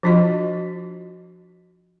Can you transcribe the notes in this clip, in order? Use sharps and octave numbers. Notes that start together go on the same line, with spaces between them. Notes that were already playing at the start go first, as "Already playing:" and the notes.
F3 D4 F4 F#4 D#5